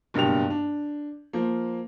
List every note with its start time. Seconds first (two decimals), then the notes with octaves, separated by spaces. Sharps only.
0.14 F#1 G2 B2 G4 F7
0.50 D4
1.33 F3 A#3